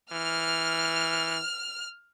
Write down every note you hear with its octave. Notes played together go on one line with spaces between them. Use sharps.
E3 F6